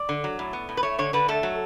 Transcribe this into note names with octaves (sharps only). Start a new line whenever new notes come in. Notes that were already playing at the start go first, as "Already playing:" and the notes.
Already playing: D5
D3
F#3
A2
B3
A2
B4
A3 C#5
D3 C#5
D3 B4
A3 A4
F#3